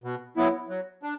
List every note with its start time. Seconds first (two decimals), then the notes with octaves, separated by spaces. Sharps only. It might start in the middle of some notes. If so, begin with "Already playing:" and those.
0.04 B2
0.37 F#3 B3 E4
0.69 F#3
1.03 D4